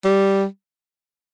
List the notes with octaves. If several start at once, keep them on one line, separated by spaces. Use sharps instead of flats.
G3